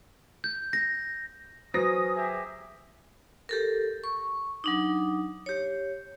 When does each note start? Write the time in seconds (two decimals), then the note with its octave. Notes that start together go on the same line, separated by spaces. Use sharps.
0.44 G6
0.73 A#6
1.74 F#3 C#4 B4 C5 D#6 A#6
2.16 G4 G#4 E5
3.49 G4 A4 A#4
4.04 C#6
4.64 F#3 D4 D#4
5.46 G4 C#5